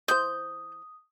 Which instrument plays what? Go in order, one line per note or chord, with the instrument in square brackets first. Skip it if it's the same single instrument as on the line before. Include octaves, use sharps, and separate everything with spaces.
[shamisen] E3 C5 [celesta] D#6 [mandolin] G6